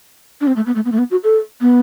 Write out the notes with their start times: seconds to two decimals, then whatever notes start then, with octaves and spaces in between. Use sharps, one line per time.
0.41 D4
0.47 C4
0.56 A3
0.66 B3
0.76 A3
0.85 B3
0.92 A3
0.98 B3
1.11 F#4
1.24 A4
1.61 B3